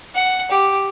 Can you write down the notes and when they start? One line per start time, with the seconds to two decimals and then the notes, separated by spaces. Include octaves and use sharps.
0.15 F#5
0.51 G4